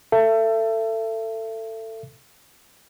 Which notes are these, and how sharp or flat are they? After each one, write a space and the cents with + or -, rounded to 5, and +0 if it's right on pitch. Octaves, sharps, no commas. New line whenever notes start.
A4 +20 E5 +30